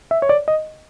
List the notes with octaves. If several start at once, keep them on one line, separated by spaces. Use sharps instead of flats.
E5
C#5
D5
D#5